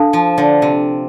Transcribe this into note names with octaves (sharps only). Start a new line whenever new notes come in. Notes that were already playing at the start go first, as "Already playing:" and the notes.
Already playing: D4 A4 F5 A5
F3
D3
C3